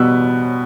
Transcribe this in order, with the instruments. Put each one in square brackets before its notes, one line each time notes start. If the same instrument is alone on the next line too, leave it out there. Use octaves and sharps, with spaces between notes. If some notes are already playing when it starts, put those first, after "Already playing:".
Already playing: [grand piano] B2 G3 B3 E6 F#6